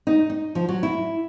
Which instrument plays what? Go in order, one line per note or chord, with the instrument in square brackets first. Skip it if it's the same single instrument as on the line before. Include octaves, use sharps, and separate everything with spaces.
[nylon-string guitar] D#4
D#4
F3
F#3
E4